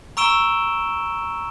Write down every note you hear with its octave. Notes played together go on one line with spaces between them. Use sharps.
A#5 C#6 E6 D7 E7 G7